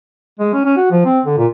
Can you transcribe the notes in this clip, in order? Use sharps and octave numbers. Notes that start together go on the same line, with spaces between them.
G#3
C#4
C#4
F#4
F3
C4
D3
A#2